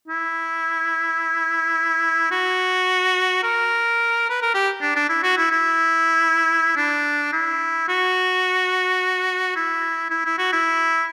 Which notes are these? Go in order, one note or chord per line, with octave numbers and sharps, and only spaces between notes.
E4
F#4
A#4
B4
A#4
G4
D4
D4
E4
F#4
E4
E4
D4
E4
F#4
E4
E4
E4
F#4
E4